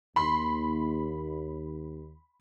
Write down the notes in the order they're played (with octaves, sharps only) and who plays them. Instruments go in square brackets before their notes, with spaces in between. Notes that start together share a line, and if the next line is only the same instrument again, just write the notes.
[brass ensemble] D#2 [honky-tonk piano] B5 C6